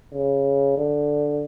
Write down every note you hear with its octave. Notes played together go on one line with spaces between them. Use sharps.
C#3
D3